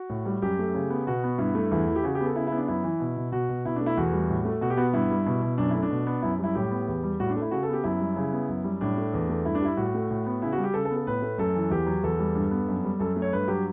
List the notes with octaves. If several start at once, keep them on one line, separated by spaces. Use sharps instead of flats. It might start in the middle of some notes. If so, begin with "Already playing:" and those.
Already playing: F#4
A2
G3
F#2 G4
A3
C#3
B3
B2 F#4
B3
G2 E4
A3
E2 E4
E3
G4
C#3 F#4
G4
B3
A4
C#3 E4
E4
B3
D4
F#2 E4
E3
B2
B2
B2 F#4
B2
B2 E4
A3 D4
E4
E2 F#4
G3
A2
A3
B2 F#4
G4
B3 F#4
G2 E4
G3
B2
B2
F#2 D4
A3 E4
D4
B2
B3
F#2 E4
G3 E4
A2 G4
B3
E2
G3
A2 F#4
D4
A3
E4
C#3 F#4
A4
B3 G4
F#2 E4
G3
C#3
B3
F#2
G3
A2 D4
A3
E2
A3
G2 E4
D4
G3 E4
A2 F#4
A3
A2
B3
C#3 E4
F#4
G3
G4
C#3 A4
A4
B3
A4
A2 B4
A3
F#2 A4
E3
E2 G4
F#3
E2 A4
G3
G2
B3
F#2
G3
F#2 A4
A3
C#5
G2 B4
F#3 G4